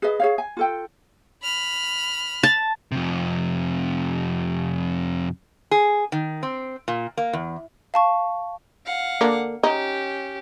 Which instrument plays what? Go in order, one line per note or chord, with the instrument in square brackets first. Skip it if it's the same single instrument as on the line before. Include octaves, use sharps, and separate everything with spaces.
[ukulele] G#4 B4 D#5
G#4 C#5 F5
G#5
F4 A4 G5
[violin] B5 F6
[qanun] A5
[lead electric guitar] F2 C3
[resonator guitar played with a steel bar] G#4
D#3
C4
A#2
A#3
E2
[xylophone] F5 A5 C#6
[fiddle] F5 F#5
[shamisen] D3 A#3 D4
[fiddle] C#4 G4 [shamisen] D#4